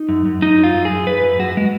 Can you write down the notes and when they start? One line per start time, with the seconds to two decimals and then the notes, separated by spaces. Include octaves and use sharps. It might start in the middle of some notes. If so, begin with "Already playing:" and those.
Already playing: D#4
0.09 F#2
0.26 F#2
0.42 F#2 D#4
0.58 F#3
0.64 F4
0.74 F#2
0.85 G#4
0.91 F#2
1.07 F#2 B4
1.24 F#2
1.39 F#2 F#4
1.57 G#3